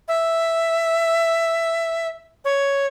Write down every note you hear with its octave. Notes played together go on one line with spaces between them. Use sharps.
E5
C#5